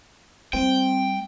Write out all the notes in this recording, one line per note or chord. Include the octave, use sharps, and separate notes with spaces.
G3 A3 C4 G5